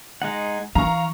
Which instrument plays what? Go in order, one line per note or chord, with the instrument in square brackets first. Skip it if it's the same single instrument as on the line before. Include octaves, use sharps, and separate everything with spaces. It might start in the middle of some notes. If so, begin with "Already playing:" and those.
[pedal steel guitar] G#3 D#4 F#5
[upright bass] E3 [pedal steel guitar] F5 [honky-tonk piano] A#5 C#6